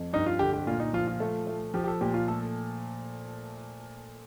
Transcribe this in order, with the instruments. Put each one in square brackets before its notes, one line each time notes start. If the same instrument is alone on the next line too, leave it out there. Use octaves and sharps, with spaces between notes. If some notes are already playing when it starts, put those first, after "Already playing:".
Already playing: [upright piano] F2
[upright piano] G2 [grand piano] D#4
[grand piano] F4
[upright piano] D3 [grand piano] G4
[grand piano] G4
[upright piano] A#2 [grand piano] F4
[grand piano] D#4
[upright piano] F3 [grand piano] F4
[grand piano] F4
[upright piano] A3
A3
[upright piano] F3 [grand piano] G4
[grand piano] G4
A4
[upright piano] A#2 [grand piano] G4
[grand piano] F4
[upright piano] A3 [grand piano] A4